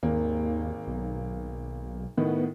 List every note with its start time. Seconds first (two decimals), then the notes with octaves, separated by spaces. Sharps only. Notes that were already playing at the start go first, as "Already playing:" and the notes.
0.03 G#1 D#2 A#3
0.87 B1
2.18 A2 D#3 B3